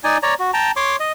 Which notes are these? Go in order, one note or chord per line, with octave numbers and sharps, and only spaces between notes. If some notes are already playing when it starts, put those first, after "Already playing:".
D#4 D5 G#5
C#5 D5 A#5
F#4
G5 A5 A#5
C#5 C6 D6
D#5